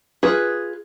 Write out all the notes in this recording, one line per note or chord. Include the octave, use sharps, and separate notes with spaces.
F4 G#4 B4